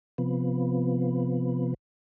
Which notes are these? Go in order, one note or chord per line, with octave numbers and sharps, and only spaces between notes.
C3 F3 B3